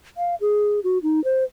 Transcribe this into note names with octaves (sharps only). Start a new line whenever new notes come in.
F5
G#4
F#4
D#4
C5